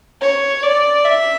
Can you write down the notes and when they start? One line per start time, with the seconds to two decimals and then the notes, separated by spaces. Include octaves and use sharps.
0.21 C#5
0.63 D5
1.05 E5